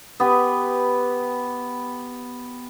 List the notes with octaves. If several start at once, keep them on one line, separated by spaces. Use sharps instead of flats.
B3 G4 B4